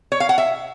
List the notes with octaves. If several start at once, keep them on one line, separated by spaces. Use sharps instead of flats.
C#5
F5
F#5
E5